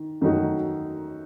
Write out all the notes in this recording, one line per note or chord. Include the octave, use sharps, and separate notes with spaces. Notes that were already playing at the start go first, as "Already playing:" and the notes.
Already playing: D#3
F#2 D#3 A3 D#4 F#4